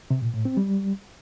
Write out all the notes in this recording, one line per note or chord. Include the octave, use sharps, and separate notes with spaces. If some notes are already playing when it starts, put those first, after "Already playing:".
C3
A#2
A2
C4
G3